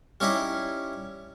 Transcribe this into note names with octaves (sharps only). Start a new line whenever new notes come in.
G3 C#4 D#4 E4 G4